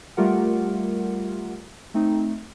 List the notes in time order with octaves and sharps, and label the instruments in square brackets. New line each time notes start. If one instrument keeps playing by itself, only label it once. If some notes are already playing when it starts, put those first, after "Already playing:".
[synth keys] G3 A3 F4 G4 A#4 F#5
A3 C4 D#4